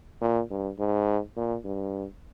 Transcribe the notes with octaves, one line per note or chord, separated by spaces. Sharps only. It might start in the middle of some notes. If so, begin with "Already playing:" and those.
A#2
G2
G#2
A#2
G2